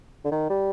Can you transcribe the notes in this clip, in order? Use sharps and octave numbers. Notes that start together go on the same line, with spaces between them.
D3
D#3
G3